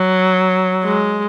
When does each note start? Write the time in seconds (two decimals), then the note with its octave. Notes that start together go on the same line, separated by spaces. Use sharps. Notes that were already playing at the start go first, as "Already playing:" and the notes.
Already playing: F#3
0.84 G#3